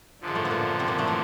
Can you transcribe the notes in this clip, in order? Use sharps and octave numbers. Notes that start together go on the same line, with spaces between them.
F#2 D3 F3
G#3
A2 A3
B3
A#2 A#3
C3 C4
A#2 A#3
A2 A3
E3